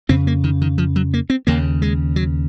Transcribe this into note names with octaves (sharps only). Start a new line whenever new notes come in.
F2 C#3 C4
A#3
D#3
D#3
F3
F#3
A#3
C4
D#2 C#3 A#3
G#3
F#3